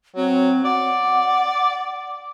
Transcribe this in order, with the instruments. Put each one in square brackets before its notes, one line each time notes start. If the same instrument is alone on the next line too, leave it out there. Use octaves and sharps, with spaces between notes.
[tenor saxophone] F#3 [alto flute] C4
[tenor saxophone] D5 [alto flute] F#5